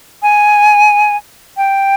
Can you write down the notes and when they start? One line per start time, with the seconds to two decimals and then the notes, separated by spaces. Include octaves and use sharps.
0.23 G#5
1.57 G5